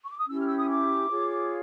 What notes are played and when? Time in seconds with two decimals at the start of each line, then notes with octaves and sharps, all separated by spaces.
0.03 C#6
0.10 D6
0.19 D#6
0.27 C#4 E4 G4 E6
0.38 F6
0.47 E6
0.57 D#6
0.69 D6
1.08 F4 G#4 C#5